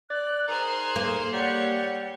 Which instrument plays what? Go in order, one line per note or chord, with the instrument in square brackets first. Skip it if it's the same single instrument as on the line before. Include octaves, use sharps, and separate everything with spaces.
[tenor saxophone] D5 [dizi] F#6
[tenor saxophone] D#3 [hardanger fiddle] G#4 C5 [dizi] A#5
[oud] A#3
[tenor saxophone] G3 [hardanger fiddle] C#5 [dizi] F#5